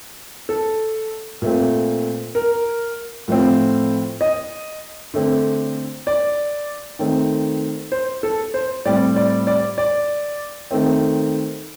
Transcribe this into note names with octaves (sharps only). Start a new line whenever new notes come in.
A4
A#2 A3 C4
A#4
A2 F3 A3 C4
D#5
D3 A3 C4
D5
D#3 A3 C4
C5
A4
C5
A2 G3 C4 D5
D5
D5
D5
D#3 A3 C4